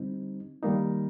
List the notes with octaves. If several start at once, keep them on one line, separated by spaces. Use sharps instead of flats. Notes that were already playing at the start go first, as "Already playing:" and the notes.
Already playing: D3 G3 C4 D#4
D#3 G3 A#3 D#4